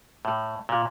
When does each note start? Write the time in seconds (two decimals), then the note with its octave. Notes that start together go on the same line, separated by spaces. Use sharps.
0.25 A2
0.69 A#2